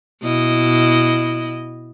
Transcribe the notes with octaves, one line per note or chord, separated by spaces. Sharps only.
B2 E4 D#5